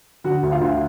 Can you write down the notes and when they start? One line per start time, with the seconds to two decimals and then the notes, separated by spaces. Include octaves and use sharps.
0.24 D3 F#4 F#5
0.43 D2
0.52 F4 F5
0.61 D2